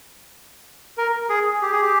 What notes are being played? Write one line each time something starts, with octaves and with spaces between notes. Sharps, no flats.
A#4
G#4
G4
G#4
G4